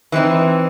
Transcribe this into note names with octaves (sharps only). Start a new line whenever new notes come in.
E3 G3 C4 D#4